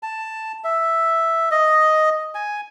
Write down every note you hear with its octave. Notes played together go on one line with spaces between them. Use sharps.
A5
E5
D#5
G#5